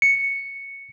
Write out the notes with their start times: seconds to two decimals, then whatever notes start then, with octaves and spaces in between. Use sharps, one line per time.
0.02 C#7